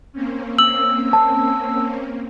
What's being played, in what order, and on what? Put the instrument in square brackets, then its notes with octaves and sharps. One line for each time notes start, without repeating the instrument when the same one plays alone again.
[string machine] A#3 C4 C#4
[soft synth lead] E6 [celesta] F#7
[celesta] A5